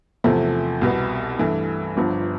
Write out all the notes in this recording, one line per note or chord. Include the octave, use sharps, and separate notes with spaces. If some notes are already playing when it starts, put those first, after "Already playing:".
E2 C3 F3 A3
C2 B2 B3
G2 E3 A3
G1 G2 F3 B3